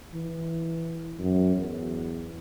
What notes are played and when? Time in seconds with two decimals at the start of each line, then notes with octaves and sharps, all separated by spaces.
0.14 E3
1.19 F#2
1.57 E2